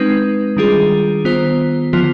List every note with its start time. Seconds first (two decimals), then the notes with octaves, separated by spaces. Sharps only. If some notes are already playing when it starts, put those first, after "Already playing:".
Already playing: G#3 C4 D#4 B4
0.57 D#3 G3 D4 F4 G#4
1.25 D#3 B3 F4 C5
1.93 D3 F3 B3 F4